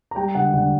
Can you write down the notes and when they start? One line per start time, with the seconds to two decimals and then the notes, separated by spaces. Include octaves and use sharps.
0.11 A#5
0.16 G3 G5
0.35 D3 F#5
0.54 D3 F#5